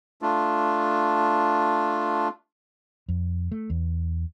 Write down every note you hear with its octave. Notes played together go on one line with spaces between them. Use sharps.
A3 D4 F4
F2
A3
E2